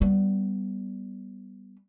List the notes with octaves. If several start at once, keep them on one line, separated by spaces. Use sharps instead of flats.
G3 B3